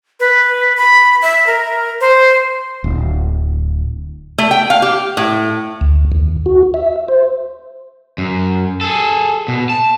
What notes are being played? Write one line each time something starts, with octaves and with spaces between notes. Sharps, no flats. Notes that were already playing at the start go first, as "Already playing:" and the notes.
B4
B5
E5
A#4
C5
D1
A3
G5
F5
G4
A2
D2
D#2
F#4
E5
C5
F#2
G#4 A4
B2
A5